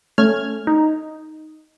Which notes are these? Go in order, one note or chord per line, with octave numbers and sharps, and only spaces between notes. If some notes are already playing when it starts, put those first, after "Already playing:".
A3 C#4 F6 G#6
D#4